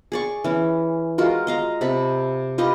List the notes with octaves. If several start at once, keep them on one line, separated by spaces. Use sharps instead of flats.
G#4 D5 C#6
E3 C#4
G#3 F4 F#4 A#4
D#5 F5 A#5
C3 A4 B5
F4 G4 B4 D#5